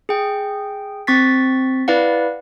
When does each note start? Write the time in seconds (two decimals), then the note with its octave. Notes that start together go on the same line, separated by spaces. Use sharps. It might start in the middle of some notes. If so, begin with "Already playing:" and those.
0.09 G#4 G5
1.07 C4 C#6 A6 B6
1.88 E4 B4 D5 F5 F#5